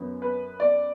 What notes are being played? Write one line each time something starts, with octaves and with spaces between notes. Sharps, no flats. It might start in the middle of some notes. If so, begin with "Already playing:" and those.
Already playing: F#2 F#3 B3
B4
D5